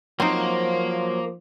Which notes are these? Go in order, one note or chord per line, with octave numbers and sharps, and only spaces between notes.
F3 F#3 A#3 C4 D#4 C5